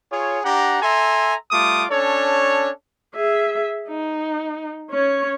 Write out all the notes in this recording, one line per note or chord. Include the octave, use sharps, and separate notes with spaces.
F4 G#4 C#5
D4 G4 F#5 A#5
A4 E5 G#5 A#5 C6
G3 A3 F4 D6 D#6
C#4 D4 A4 C#5
G#4 E5
D#4
C#4 C#5